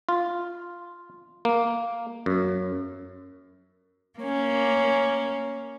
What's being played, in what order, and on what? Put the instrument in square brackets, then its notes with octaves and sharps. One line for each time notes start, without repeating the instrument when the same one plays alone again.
[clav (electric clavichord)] F4
A#3
F#2
[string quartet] A#3 C#4